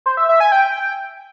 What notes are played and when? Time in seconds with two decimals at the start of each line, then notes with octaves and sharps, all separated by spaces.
0.06 C5
0.17 E5
0.29 E5
0.40 G#5
0.52 G5